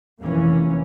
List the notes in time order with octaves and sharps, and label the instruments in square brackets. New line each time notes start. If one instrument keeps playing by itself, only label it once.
[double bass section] F1 E3 A#3 C#4